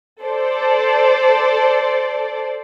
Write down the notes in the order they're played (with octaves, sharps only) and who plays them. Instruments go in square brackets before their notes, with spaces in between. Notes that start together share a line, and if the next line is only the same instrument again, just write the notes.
[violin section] A4 C5 D5